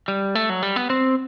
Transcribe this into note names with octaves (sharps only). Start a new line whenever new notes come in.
G3
A3
F#3
G3
B3
C4